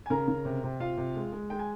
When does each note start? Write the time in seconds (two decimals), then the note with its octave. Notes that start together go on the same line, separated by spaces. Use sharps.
0.06 G#5
0.10 C#3 A#4 A#5
0.28 C#3
0.45 C3
0.64 C3
0.80 C3 F4 F5
0.97 C3
1.16 G#3
1.32 G#3
1.50 G#3 G5
1.59 G#5